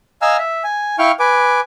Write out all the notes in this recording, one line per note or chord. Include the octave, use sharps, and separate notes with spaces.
D#5 F5 G#5 A#5 E6 F6
E5
G#5
E4 F5 G5 C#6 F6
B4 G#5 D6